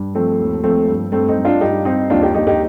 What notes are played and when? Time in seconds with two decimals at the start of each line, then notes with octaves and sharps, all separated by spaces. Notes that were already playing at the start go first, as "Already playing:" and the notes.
Already playing: G2
0.15 F3 A3 C4
0.40 D#2
0.63 F3 A3 C4
0.88 G2
1.12 G2 A3 C4
1.28 C4 D#4
1.36 G2
1.45 D4 F4
1.61 G2 D#4 G4
1.85 G2 C4 D#4
2.10 D#2 D4 F4
2.22 D#4 G4
2.34 D#2 D#4 G4
2.47 D#4 G4